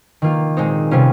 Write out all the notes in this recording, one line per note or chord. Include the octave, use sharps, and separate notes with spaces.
D#3 A#3 F4
A#2 G#3 C4 D#4
C3 G3 C#4 F4